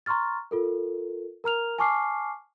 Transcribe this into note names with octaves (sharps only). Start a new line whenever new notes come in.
A#5 C6 C#6 F6 A6
F4 A4 A#4
A#4 A#5 F6 F7
G#5 A5 C#6 D6 F6 C7